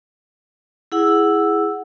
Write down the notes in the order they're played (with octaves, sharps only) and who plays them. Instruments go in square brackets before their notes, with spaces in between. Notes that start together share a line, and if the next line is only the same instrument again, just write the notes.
[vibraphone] E4 G#4 F#5 E6